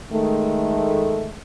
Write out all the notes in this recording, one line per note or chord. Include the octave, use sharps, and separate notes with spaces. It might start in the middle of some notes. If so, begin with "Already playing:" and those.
D#3 G#3 A3